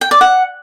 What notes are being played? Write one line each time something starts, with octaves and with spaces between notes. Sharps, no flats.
G5
D5
F#5